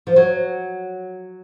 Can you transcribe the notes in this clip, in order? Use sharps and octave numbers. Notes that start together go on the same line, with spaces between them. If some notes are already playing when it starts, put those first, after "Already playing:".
F3
F#3